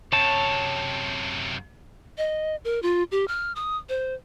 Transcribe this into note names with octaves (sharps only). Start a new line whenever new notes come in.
F#2 C3 C#5 A5
D#5
A#4
F4
G4
F6
D#6
C5